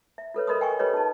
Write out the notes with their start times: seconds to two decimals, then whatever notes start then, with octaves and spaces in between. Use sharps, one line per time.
0.18 E5
0.34 F4 A4 B4 C#5
0.47 A4 A#4 D#5 B5 C6 D#6
0.61 D#5 G5 G#5 C6 C#6
0.79 F4 G4 A4 B4 C#5 D#5
0.93 D#4 A5